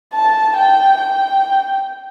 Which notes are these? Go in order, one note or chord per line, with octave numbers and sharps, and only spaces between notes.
A5
G5
G5